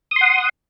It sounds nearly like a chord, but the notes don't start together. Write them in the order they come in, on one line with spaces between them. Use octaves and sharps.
D#6 C6 F#5